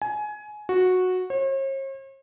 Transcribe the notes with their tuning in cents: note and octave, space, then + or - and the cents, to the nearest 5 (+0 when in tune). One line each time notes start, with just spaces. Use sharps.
G#5 +20
F#4 -10
C#5 -45